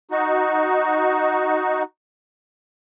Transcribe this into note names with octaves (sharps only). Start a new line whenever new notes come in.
D#4 F#4